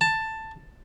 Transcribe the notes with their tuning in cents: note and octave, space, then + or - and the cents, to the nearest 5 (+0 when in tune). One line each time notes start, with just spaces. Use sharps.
A5 +10